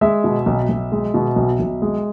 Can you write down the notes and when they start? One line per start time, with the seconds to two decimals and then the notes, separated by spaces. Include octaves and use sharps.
0.01 G#3 E5
0.24 B2
0.46 B1
0.69 B1
0.92 G#3
1.14 B2
1.36 B1
1.60 B1
1.82 G#3